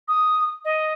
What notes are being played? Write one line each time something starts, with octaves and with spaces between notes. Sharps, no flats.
D#6
D#5